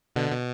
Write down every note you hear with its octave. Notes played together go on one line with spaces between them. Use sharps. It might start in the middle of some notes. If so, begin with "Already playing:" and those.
B2 D3
B2